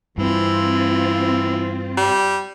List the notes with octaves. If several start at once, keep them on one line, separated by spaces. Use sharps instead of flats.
G2 E3 C4 F4
G3